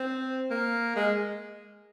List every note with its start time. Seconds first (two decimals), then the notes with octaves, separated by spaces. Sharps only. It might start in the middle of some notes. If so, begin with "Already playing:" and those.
Already playing: C4
0.51 A#3
0.96 G#3